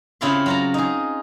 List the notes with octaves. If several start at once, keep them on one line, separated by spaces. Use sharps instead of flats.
C#3 C4 E4 F4 F5 C6
F#3 F4 A#5
D#4 G#4